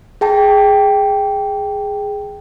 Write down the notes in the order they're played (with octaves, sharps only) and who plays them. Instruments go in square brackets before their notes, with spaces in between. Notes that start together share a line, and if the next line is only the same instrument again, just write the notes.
[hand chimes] G#4 G5 A5